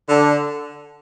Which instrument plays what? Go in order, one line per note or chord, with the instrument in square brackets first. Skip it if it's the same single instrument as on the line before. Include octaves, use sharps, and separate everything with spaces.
[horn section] D3